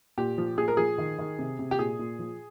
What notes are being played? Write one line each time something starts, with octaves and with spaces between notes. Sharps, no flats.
A#2 G4
F3
A#2 G#4
A#4
F3 G#4
D#3
D#3
C3
C3
G4
A#2 G#4
A#2
F3